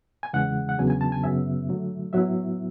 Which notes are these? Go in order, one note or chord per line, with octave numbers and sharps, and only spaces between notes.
G#5
E2 C#3 E3 G#3 F#5
F#5
E2 C#3 F#3 B3 D4 G#5
G#5
A5
G#5
F#2 C#3 F#3 B3 E5
D3 F#3 A3
A2 F#3 B3 E4 E5